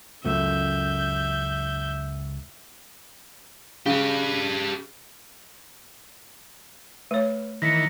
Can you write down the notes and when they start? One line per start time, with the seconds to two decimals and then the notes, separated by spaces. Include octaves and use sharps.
0.24 C#2 F#2 A3 E5 G6
3.86 C#3 G4 B4
7.11 A3 B4 C#5
7.62 D#3 E3 A#6 B6 C#7